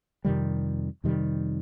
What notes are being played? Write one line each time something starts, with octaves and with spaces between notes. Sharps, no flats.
F2 C3 D#3 G3
F2 C3 D#3 G3